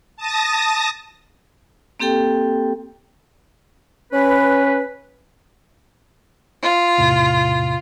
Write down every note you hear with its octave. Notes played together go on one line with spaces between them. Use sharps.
A5 D#6 A#6
A#3 C4 G4 A4 G5
C#4 B4
F4
E2 A2 C3